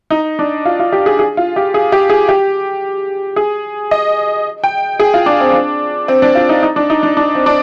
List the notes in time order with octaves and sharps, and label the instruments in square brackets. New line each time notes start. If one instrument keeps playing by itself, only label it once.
[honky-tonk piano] D#4
D4
F4
F4
G4
G#4
G#4
F4
G4
G#4
G4
G#4
G4
G#4
D#5
G5
G#4
F4
D4
C4
D4
C4
D4
F4
D#4
D#4
D4
D#4
D4
D4
C4
D4